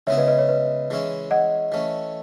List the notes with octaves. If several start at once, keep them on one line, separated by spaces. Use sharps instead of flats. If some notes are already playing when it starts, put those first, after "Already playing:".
C#3 G#3 B3 E4 C#5 E5
B4 D#5
B4 D#5
C#5
B4
E3 G#3 C#4 E4
D#5 F#5
E3 A3 C#4